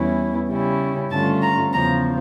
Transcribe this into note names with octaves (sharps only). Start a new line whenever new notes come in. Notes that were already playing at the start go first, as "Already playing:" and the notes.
Already playing: E2 E3 G3 C#4 E4
C#3 G3 C#4 E4
G2 D3 A3 C#4 F4 A5
A#5
E2 C#3 F3 A#5